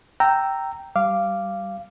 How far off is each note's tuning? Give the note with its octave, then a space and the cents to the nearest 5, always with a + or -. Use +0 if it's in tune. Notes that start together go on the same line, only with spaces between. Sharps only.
G5 -5 A#5 -10 E6 +0
G3 -10 F5 -15 D6 +0